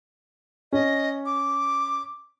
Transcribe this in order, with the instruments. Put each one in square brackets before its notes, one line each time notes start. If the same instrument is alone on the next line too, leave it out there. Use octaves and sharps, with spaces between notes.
[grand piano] C#4 [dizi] D#5
[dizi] D6